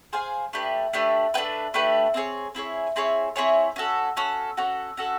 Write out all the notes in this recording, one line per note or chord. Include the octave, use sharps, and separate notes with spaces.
G#4 C5 F5 G#5
A3 D4 G4 B4
A3 D4 G4 B4
A3 D4 G4 B4
A3 D4 G4 B4
C4 E4 G#4 C#5
C4 E4 G#4 C#5
C4 E4 G#4 C#5
C4 E4 G#4 C#5
C#4 F#4 A4
C#4 F#4 A4
C#4 F#4 A4
C#4 F#4 A4